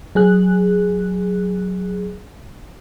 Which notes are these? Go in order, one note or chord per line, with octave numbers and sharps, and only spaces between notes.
F#3 G#4 F#6